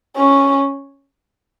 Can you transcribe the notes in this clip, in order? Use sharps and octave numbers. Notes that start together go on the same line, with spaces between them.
C#4